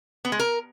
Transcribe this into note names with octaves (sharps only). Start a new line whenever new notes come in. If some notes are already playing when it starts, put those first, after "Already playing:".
B3
G#3
A#4